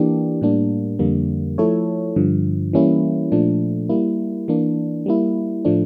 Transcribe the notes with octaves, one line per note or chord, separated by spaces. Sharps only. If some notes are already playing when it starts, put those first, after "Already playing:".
Already playing: E3 A#3 D4 G4
A2 G3 A#3 D4
F2 D3 G3 A#3
F3 A3 E4 A4 C#5
G2 D3 F3
E3 G3 A#3 C#4 E4
A#2 F3 A3 D4
G3 A#3 E4
E3 A#3 D4
G3 A#3 E4
A2 F3 A3 D4